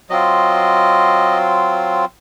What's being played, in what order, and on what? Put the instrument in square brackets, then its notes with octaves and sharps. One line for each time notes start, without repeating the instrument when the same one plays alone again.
[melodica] F#3 C4 F4 D#5